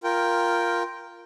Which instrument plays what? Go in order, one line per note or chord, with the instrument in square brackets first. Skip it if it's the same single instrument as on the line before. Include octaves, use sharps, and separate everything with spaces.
[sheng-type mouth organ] F4 A#4 G5